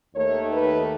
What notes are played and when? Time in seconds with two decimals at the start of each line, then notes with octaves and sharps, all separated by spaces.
0.15 D#2 D#3 A3 C#5
0.52 B4